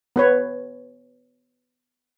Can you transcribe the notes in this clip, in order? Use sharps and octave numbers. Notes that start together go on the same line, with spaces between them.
B3 B4 C#5